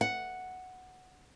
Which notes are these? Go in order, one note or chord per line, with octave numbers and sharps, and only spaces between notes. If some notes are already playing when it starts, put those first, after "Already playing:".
F#5